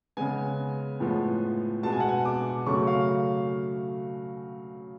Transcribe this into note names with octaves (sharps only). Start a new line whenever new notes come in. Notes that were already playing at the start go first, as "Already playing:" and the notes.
C#3 G#3 B3 G#5
A2 F3 G#3 B3
B2 G#3 B3 A5
G#5
F#5
G#5
D6
C#3 F#3 A3 C#6
F5